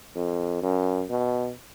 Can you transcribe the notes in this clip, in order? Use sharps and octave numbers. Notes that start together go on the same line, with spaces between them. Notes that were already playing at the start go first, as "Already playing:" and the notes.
F2
F#2
B2